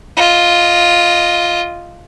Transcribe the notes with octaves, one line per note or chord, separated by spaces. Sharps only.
F4 D#5